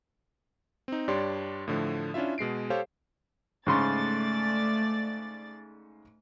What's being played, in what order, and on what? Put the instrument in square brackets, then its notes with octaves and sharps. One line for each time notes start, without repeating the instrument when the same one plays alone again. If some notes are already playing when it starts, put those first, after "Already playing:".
[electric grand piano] C4 D#4
G2 D4 G4 C#5 D5 C6
A2 D3 F3 A3
C#4 D4 E4 F4 E5
B2 G#3 C7 D7
G4 A4 C5 C#5 F5
[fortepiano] G#2 C#3 C6 [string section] A3 D5 A6